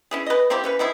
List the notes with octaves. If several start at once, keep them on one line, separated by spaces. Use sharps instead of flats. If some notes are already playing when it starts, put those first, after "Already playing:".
C#4 E4 G#4
B4 D#5
A#3 C4 E4 G4
E3 C#4 B4
D#3 F3 E4 G#4